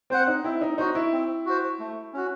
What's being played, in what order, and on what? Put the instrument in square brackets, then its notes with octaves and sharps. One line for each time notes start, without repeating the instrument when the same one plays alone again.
[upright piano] C4 [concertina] C5 F#5
[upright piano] D#4
[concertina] C4 [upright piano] E4
[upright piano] D#4
[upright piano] D#4 [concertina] F#4 C5
[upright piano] E4
[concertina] C4
F#4 C5
A3
C#4 F#4